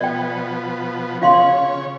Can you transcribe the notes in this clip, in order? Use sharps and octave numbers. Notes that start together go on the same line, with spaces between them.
B2 F3 B3 D5 G5
C#3 F4 C#5 F5 C6